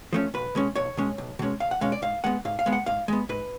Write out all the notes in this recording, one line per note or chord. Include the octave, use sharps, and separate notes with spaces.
F3 A3 C#4
B1 B4
B2 G#3 C#4
B1 C#5
B2 G#3 C#4
B1
B2 G#3 C#4
B1 F5
F#5
B2 G#3 C#4 F5
D5
G#2 F5
G#3 B3 F#5
G#2 F5
F5
G#3 B3
F#5
G#2 F5
G#3 B3
G#2 B4